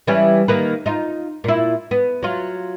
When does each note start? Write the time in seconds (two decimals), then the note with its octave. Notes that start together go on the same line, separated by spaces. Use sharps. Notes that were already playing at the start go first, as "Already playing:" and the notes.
0.07 E3 G3 C#4
0.48 D#3 A#3 B4
0.86 D#4 F4
1.44 A#2 E4
1.91 B3
2.22 F#3 F4